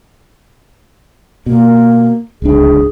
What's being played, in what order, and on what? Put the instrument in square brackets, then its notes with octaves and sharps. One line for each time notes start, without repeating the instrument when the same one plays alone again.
[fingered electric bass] B2 [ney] A#3
[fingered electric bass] D1 C#2 D4 [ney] G#4